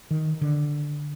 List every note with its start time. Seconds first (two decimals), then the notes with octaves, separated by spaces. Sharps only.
0.11 D#3
0.41 D3